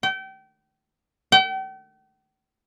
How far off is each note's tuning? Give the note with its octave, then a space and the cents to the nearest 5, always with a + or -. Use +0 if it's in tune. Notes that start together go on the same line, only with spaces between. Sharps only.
G5 -30
G5 -40